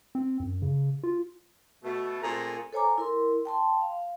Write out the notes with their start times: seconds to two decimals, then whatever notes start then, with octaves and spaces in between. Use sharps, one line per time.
0.15 C4
0.40 F#2
0.62 C#3
1.03 F4
1.83 B2 A3
2.22 A#2 A3 C4 G#4 A#5
2.73 A4 C5 C#5 G#5 A#5 D6
2.98 E4 A#4 C6
3.45 G5 A5 C6
3.81 F5